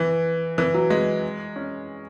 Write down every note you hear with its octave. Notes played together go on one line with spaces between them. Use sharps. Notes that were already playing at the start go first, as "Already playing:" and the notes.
Already playing: E3
E3
F#3
G#3
C#4